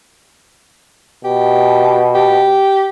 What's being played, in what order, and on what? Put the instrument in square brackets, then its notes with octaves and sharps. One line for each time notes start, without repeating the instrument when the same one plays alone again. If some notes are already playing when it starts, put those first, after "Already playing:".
[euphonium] B2 [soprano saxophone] G4
[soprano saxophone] G4